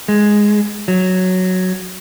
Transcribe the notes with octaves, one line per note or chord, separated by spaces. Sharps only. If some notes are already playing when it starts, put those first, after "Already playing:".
G#3
F#3